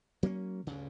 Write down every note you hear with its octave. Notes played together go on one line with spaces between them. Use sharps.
F#3 A#3 B3 C#4
D2 G2 C#3